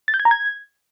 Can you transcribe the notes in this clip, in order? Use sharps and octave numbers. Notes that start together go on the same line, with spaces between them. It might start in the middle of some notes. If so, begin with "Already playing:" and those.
A6
G6
G#6
A#5
G#6